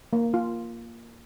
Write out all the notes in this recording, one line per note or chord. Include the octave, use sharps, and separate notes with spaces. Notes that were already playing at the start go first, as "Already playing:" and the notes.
A#3
F4